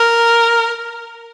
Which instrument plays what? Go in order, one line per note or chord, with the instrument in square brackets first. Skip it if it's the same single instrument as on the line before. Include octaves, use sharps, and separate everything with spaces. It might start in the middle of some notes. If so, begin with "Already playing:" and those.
Already playing: [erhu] A#4